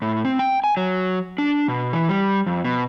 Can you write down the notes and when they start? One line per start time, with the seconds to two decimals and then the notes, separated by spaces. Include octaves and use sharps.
0.02 A2
0.25 C4
0.39 G5
0.64 G#5
0.77 F#3
1.38 D4
1.68 B2
1.93 E3
2.09 G3
2.47 F2
2.65 B2